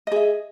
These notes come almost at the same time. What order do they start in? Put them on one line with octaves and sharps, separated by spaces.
D#5 G#4 E5